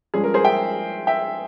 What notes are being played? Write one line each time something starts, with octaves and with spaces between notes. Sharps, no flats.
G2 F3 G#3 C#4 G#4
A#4
G#4 C5
E5 G5
E5 G5